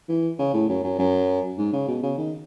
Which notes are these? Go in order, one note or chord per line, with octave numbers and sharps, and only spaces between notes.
E3
C#3
A2
F#2
F#2
F#2
G#2
C#3
B2
C#3
D#3